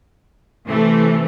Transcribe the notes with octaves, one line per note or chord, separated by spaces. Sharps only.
C3 E3 A3